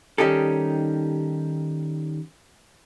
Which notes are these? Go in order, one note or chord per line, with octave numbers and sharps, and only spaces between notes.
D#3 G3 C#4 D#4 G4 A4